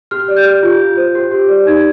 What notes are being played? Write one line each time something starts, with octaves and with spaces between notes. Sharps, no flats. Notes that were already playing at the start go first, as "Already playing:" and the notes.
G4 F6
D5
G6
G4
F4
F4
C5
G4
G4
D5
D#4 G#6